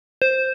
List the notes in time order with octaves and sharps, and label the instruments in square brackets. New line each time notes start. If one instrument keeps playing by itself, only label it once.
[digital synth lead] C5